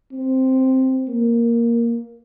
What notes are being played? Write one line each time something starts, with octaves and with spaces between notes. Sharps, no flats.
C4
A#3